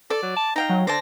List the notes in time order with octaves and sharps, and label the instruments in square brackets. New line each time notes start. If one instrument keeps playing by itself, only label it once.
[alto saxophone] A4 [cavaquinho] D5
[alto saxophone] F#3
A5
[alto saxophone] D#4 [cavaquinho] F5 G5 A#5
[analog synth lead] F#3
[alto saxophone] D3 [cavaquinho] C5 D5 A5 [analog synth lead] A#6